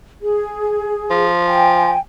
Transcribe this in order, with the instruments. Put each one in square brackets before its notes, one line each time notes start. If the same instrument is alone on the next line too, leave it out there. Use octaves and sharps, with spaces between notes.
[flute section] G#4
[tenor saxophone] F3
[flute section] G5 G#5